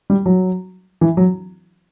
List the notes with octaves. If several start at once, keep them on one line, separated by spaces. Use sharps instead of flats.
G3
F#3
E3
F#3